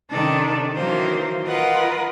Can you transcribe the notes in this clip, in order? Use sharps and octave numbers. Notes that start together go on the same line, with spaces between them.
C3 D#3 C#4 D4 A4 A#4
D#3 E3 F#3 A#3 C5
F4 A#4 B4 D#5 F#5